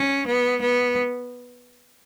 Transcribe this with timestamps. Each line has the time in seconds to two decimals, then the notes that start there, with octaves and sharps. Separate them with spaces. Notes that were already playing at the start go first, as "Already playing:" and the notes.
Already playing: C#4
0.27 B3
0.61 B3